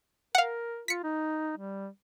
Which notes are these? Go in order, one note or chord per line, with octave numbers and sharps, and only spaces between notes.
A#4 F5 F#5
F4 B6 C#7
D#4
G3